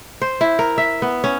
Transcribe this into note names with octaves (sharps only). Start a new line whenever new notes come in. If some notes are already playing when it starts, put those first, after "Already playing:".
C5
E4
A#4
E5
B3
C#4